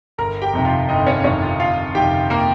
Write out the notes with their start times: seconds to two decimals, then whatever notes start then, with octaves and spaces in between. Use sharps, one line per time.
0.18 G1 A#4 A#5
0.42 G4 G5
0.53 F2 C3 D#3
0.65 F4 F5
0.89 G1 D#4 D#5
1.06 C#4 C#5
1.24 F2 C3 D#3 C#4 C#5
1.42 F4 F5
1.60 G1 F4 F5
1.95 F2 C3 D#3 G4 G5
2.30 A#3 A#4